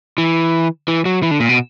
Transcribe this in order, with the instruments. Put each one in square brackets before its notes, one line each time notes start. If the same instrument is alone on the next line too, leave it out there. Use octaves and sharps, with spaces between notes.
[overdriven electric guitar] E3
E3
F#3
E3
D3
A#2
B2